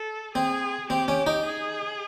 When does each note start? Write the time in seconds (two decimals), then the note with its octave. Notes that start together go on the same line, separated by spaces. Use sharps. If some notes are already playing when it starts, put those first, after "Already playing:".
Already playing: A4
0.35 C4 G#4
0.90 C4 G4
1.08 C#4
1.26 D#4
1.45 G#4